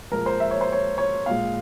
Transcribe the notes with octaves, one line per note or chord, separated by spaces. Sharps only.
A#2 F3 G#3 A#4
C5
E5
C#5
C5
C#5
C#5
A#2 G#3 F5